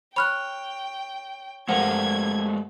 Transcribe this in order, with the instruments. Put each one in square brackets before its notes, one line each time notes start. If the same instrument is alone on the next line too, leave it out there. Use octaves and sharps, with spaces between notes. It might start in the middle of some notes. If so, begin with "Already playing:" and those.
[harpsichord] C#5 [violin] G5 [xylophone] B5 F6 F#6
[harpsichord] G2 F3 [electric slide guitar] G#3 A3 A#4 [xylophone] F#5 [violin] G#6